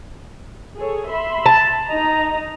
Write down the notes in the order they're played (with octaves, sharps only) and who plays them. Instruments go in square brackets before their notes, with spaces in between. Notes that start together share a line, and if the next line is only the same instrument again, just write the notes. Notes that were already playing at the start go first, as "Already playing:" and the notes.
[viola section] G#4 A4 C#5
E5 B5 C6
[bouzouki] A5
[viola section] D#4 D#5 A#5